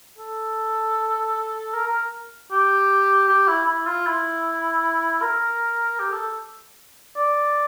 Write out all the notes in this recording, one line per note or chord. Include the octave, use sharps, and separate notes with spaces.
A4
A#4
A#4
G4
G4
E4
E4
F4
E4
A#4
G4
A4
D5